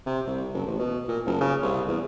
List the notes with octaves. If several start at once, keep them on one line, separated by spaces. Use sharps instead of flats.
C3
C2
F#1
A1
B2
A#2
F#1
C#3
C2
E2